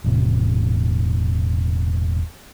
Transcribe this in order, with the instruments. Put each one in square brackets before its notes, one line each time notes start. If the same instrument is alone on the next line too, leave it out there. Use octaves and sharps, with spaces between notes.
[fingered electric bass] E1 A2 C3